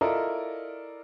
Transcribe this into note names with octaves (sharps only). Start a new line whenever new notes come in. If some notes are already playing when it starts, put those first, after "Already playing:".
E4 F4 A4 A#4 D5 D#5